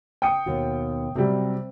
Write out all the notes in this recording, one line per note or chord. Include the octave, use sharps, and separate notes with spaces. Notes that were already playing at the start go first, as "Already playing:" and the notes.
G5 D#6 C#7
D#2 B2 F#4
C3 F#3 G3 C4